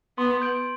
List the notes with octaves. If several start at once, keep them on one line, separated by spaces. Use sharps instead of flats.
B3 C6
G6 D7 F#7